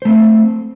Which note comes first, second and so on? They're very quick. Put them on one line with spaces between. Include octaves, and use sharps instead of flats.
C5 A3 C4